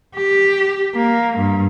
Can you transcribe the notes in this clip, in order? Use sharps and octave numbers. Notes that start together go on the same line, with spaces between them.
G4
A#3
G2